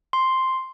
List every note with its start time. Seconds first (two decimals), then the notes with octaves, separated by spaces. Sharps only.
0.13 C6